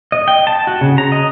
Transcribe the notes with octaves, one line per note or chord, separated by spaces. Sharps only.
D#5
G5
A5
F#4
C#3
A#5
D#5